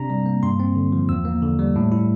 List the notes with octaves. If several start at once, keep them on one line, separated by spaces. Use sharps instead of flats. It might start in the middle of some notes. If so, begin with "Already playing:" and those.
Already playing: C3 D4 A#5
G3
A#3
G2 C6
C4
D3
F3
E2 E6
A#3
D3
G3
A2
E4